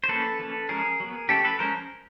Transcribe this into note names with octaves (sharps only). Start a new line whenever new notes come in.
C5
F3 A#3 C#4 A4 B4
F3 A#3 C#4
F3 G#3 C#4 G#4 A#4
F#3 B3
F3 A3 C#4 G4 A4
A4 B4
F3 G#3 C#4 A#4 C5